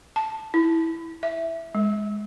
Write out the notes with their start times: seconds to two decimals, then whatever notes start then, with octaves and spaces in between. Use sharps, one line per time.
0.16 A5
0.54 E4
1.23 E5
1.75 G#3